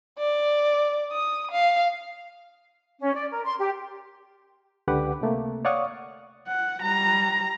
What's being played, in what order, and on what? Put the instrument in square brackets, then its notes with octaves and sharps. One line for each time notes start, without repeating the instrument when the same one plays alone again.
[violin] D5
D#6
F5
[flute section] C#4
D5
A#4
C6
G4
[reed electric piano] C#2 D3 G4 B4 F#5 D6
C3 A3 A#3
C#5 D5 F5 F#5 C#6 D#6
[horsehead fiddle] F#5
G3 A#5